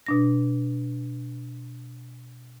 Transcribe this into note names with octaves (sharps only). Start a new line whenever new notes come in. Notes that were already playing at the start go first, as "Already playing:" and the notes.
B2 D4 A#6